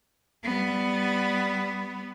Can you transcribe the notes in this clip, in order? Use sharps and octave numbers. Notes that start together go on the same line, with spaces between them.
G3 B3